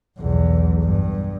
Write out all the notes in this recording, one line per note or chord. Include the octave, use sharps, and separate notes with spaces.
B1 E2
G2